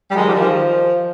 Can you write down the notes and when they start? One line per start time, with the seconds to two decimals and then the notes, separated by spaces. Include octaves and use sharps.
0.11 G3
0.16 D#3 F#3 G#3
0.29 F3 G3
0.34 D#3
0.40 F3